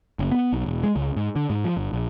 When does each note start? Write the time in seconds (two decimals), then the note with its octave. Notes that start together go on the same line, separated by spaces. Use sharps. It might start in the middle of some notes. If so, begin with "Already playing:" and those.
0.19 F#1
0.31 B3
0.53 B1
0.66 E1
0.83 G#3
0.96 C#2
1.16 G#2
1.36 D3
1.50 G#2
1.64 F3
1.77 G1
1.93 A#1